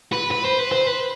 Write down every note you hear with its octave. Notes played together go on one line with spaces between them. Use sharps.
B4
B4
C5
B4
C5
B4